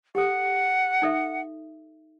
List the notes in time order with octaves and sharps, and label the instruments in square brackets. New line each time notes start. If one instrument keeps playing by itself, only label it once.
[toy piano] G4 A4 [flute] F#5
[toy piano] D#4 A4 E5